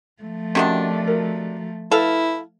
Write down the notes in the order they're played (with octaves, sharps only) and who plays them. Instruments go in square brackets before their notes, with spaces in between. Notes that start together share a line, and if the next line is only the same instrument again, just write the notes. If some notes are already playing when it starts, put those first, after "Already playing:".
[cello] F3 A3
[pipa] C3 D#3 D4 [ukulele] C#4 F#4 F#5
[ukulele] F#4 A#4
[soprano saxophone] E4 [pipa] A4 F5 [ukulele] B4